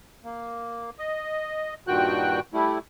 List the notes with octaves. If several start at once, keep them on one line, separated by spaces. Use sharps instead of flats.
A#3
D#5
G2 A#2 D#3 F#4 G5 F#6
G3 A3 E4